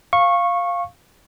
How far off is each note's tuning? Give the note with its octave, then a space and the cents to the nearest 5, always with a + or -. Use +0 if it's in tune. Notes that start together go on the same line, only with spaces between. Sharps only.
F5 +0 C#6 -15